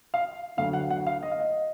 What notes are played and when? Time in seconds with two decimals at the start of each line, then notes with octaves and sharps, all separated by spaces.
0.14 F5
0.57 D2 D3 F#3 F5
0.73 F#5
0.90 F#5
1.07 F5
1.23 D#5
1.32 F5
1.40 D#5